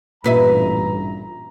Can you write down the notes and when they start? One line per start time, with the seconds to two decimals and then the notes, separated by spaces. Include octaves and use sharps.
0.24 A1 G2 A#2 B4 E5 A#5